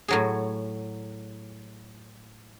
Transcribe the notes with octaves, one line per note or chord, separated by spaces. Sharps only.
A2 F#3 G#4